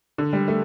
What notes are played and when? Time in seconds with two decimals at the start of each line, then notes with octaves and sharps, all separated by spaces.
0.18 D3
0.33 G3
0.48 A3